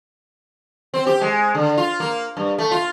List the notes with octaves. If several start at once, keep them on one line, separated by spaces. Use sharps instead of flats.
C4
G4
G#3
D3
F4
A#3
G2
A3
F4